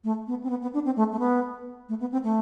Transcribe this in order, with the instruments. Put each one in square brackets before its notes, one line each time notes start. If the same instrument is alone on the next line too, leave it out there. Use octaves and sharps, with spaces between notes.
[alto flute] A3
B3
C4
B3
B3
D4
C4
A3
A3
B3
A3
B3
C4
A3